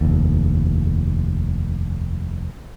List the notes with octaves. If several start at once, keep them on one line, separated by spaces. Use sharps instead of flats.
F1 D#2